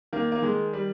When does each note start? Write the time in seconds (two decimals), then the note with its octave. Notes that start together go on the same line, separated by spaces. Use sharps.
0.13 D#3 A#3
0.32 A#3
0.42 D#3 G#3
0.73 G3